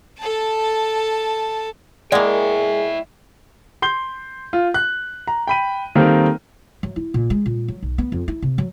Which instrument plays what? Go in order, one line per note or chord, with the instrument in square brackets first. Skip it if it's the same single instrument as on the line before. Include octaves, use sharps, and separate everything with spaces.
[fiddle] A4 A5
[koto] G#3 A#3 [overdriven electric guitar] E4 G5 [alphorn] G#4 [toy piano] D5 F#5
[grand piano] C6 G6 G7
F4
F#6
A#5
G5 B5 D#7
D#3 G3 A#3 C4 A4 A#4
[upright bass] F#3
E4
A#2
G#3
A#2
F#3
B1
B3
F2
E4
C3
F#3